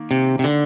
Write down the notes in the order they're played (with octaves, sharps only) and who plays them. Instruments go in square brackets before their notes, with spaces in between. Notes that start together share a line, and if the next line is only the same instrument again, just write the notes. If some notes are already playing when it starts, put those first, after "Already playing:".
Already playing: [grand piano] D#3 A#3
[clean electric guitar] C3
C3
D3